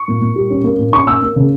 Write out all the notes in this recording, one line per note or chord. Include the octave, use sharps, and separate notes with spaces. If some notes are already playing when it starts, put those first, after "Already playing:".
Already playing: C#6
A#2
A#2
G3
C#4
A#3
A#2
C#4 C#6
A#3 E6
A#3
C#3